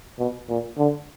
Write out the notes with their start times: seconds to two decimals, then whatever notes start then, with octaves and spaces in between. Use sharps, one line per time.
0.19 B2
0.49 A#2
0.78 D3